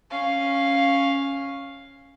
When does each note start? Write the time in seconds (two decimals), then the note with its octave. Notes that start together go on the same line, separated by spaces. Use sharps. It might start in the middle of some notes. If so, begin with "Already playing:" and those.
0.10 C#4 F5